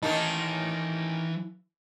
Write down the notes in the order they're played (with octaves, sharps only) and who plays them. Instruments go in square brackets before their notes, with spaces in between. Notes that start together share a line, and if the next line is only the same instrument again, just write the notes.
[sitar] D#3 A#3 D#4 [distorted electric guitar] E3 A5